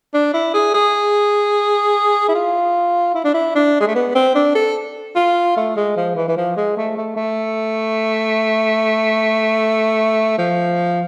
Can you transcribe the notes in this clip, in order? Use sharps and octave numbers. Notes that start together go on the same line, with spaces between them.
D4
E4
G#4
G#4
E4
F4
E4
D4
E4
D4
G#3
A3
B3
C4
D4
A4
F4
A3
G#3
F3
E3
E3
F3
G#3
A3
A3
A3
F3